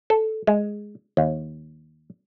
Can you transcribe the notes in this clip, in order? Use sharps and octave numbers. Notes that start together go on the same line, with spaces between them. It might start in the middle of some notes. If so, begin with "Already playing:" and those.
A4
G#3
D#2